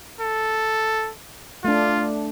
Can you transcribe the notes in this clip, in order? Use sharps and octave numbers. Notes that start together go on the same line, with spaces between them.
A4
A3 D4 F4